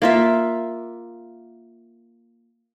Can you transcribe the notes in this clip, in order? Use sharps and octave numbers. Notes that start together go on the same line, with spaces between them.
A#3 F4 E5